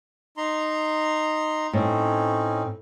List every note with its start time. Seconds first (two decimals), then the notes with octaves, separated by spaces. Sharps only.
0.37 D#4 A#5 C6
1.73 A2 C4 C#4 D#4